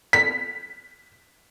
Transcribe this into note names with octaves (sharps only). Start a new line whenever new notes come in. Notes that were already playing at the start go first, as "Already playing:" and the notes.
B6